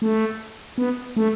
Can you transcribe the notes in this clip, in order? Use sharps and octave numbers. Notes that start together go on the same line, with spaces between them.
A3
B3
A3